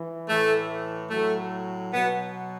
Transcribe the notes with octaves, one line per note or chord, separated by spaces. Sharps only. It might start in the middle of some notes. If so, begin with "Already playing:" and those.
Already playing: E3
A2 E3 A3
A2 F#3 A3
B2 F#3 B3